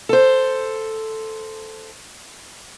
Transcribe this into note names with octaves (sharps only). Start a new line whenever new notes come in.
A4 C5